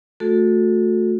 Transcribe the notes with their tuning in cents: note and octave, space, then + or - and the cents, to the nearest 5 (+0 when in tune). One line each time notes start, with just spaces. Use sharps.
A3 +0 F#4 -30 A4 +0